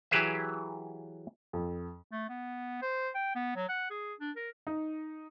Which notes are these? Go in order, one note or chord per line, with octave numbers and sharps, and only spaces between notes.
E3 F#3 G4 G#4 B4 E5
F2
A3
B3
C5
G5
B3
F#3
F#5
G#4
D4
A#4
D#4